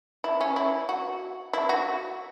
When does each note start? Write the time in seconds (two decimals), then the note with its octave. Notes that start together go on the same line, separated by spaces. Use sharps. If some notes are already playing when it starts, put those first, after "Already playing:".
0.24 E4
0.41 C#4
0.56 E4
0.89 F#4
1.53 E4
1.69 F#4